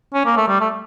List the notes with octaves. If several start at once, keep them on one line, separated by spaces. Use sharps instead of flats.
C#4
A#3
A3
G3
A3